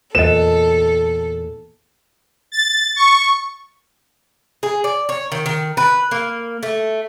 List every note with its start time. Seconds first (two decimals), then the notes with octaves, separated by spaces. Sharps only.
0.15 E2 A#2 A4 C5 D#5 E7
2.52 A6
2.96 C#6
4.63 G#4
4.84 D5
5.09 C#5
5.32 D#3
5.46 D#3
5.77 B4
6.11 A#3
6.63 A3